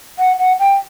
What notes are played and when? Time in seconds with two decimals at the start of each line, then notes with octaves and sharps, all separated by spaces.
0.19 F#5
0.39 F#5
0.60 G5